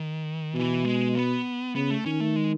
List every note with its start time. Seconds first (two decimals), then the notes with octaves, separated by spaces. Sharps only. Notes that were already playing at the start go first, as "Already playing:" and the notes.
Already playing: D#3
0.54 B2 E3
0.85 G#3
1.15 B3
1.75 C#3 B3
1.90 A3
2.06 D#3 C#4
2.20 A3
2.36 G#3